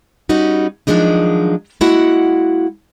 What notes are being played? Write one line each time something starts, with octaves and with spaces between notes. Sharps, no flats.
G3 C#4 D#4 F#4
D#3 F3 F#3 G#3 D4 D#4
G#3 A#3 E4 F#4 F#5